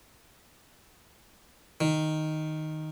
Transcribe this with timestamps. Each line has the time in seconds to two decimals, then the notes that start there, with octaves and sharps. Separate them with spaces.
1.81 D#3